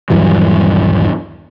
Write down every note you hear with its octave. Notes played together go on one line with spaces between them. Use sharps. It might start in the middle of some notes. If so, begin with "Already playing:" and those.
D#1 G2 E3 F#3